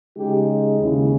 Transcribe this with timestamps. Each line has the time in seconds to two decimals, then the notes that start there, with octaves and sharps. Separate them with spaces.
0.17 C#3 G#3 D#4 G4
0.78 D#2 C#3 G#3 C#4 E4